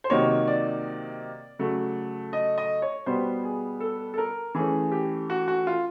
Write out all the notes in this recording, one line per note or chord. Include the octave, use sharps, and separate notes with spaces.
C5
C3 D#3 F#3 A#3 D#4 C#5
D5
C#3 F#3 A3
D#5
D#5
C#5
B2 G3 B3 C5
G#4
A4
A4
A#4
E3 A3 C#4 G#4
G4
F#4
F#4
F4